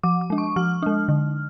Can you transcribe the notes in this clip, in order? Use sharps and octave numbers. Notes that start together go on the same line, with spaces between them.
F3 D6
D6
G#3 D4
C#6
F3 F6
G#3 D4
D3